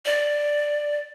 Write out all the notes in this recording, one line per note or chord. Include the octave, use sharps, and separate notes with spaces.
D5